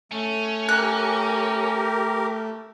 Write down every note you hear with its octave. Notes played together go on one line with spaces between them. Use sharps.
A3 C#4
G4 A#4 F#6